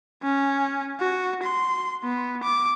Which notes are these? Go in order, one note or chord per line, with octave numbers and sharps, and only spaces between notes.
C#4
F#4
C6
B3
D6